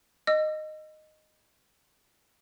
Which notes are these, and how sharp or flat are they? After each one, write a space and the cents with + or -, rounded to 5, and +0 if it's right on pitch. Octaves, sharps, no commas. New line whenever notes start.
D#5 -10 E6 +35